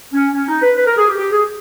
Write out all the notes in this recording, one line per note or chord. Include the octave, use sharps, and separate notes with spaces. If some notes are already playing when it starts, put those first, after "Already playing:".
C#4
C#4
D#4
B4
B4
A#4
G#4
G4
G4
G#4